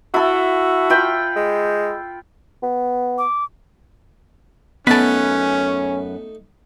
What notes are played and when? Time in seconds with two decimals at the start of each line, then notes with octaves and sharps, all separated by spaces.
0.14 E4 F#4 A4
0.90 F4 G5 B5
1.36 G#3
2.63 B3
3.18 D6
4.87 F#2 A3 B3 C#4 D#4 B4 A5 B5